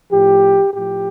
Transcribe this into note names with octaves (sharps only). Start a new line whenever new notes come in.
A2 F3 G4
A2 F3 G4